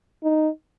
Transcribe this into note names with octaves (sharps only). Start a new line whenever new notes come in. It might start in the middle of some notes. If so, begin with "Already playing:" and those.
D#4